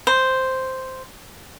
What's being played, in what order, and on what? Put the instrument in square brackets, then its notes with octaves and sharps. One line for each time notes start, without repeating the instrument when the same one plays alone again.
[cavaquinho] C5